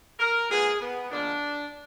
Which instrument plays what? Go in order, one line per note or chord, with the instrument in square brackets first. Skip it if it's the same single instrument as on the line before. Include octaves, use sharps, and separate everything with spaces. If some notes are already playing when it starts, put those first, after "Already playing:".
[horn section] A#4
A#2 G#3 B3 G#4
B3
A#2 F3 G#3 D4